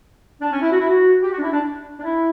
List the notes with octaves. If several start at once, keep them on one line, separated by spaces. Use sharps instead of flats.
D4
C#4
E4
F#4
E4
F#4
G4
F#4
D4
E4
D4
D4
E4